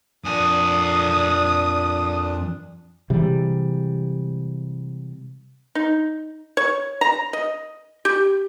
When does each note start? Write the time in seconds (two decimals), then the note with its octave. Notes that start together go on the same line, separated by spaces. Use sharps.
0.24 F2 A#2 D4 G#5 D#6
3.10 C3 E3 G3 G#3
5.75 D#4
6.57 C#5
7.01 A#5
7.33 D#5
8.05 G4